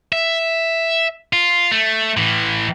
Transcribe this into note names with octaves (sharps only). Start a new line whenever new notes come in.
E5
F4
A3
A2 E3